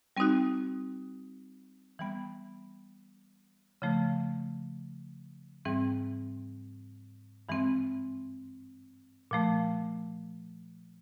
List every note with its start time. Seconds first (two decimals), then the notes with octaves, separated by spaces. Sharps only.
0.17 G3 C4 D#4 F#4
1.99 E3 G3 B3
3.82 C#3 F3 A3
5.65 G#2 E3 G3 C4
7.49 G2 E3 G#3 C4
9.31 A#2 F3 A3